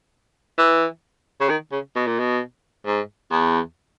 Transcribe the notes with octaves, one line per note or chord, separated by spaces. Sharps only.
E3
C#3
D#3
C#3
B2
A#2
B2
G#2
E2